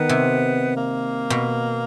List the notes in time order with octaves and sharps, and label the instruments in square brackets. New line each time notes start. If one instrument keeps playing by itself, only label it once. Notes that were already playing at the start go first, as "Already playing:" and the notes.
Already playing: [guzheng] D#3 [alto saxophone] B3
[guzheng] C3
[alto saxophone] A#3
[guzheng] B2